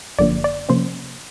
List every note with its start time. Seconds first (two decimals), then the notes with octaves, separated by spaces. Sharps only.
0.18 G1 F#2 D3 F3 A#3 D5
0.44 D5
0.69 C3 F3 A#3 C#4 C5